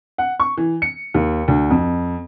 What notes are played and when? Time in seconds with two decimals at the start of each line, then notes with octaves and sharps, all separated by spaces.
0.18 F#5
0.40 C#6
0.57 E3
0.82 C#7
1.14 D#2
1.48 D2
1.70 F2